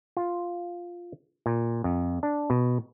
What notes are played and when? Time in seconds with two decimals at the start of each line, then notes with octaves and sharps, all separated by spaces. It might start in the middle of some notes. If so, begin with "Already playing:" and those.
0.17 F4
1.46 A#2
1.84 F2
2.23 D4
2.50 B2